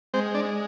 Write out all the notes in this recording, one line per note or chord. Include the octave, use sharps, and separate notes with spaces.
G#3 C4 C5
D4 D5